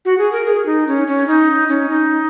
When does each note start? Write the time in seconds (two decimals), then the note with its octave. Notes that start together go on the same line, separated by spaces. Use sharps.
0.05 F#4
0.18 G#4
0.32 A#4
0.46 G#4
0.66 D#4
0.87 C#4
1.07 C#4
1.28 D#4
1.68 C#4
1.89 D#4